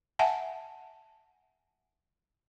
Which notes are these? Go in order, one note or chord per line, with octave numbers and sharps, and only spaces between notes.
E5 F#5 G#5 A5